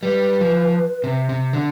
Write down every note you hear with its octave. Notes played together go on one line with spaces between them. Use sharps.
G3 B4
F3
C3
C3
D3